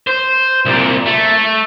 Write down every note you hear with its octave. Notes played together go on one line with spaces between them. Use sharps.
C5
C2 A#2
A3